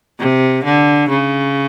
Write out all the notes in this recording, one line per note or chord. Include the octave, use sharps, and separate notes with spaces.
C3
D3
C#3